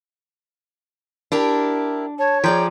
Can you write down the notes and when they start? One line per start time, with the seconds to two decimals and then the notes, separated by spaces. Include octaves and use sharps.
1.32 D4 E4 G4 A#4
2.19 C#5 A5
2.44 F3 G#4 D5 G5 A#5